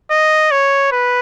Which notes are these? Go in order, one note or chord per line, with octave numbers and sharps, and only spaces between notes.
D#5
C#5
B4